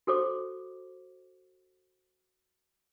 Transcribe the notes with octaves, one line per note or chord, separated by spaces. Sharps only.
F#4 A4 C5 D6